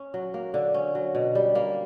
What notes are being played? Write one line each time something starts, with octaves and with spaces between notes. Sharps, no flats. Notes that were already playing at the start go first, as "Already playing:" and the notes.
Already playing: C#4
F#3
A#3
D3
C#4
F#3
B2
G3
A#3